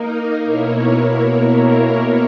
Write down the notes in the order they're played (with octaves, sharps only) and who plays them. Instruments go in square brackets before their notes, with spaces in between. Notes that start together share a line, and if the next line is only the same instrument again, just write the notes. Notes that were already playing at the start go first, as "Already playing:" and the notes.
Already playing: [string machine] A#3 D#4 A#4
B2 A#3 E4 A#4 C#5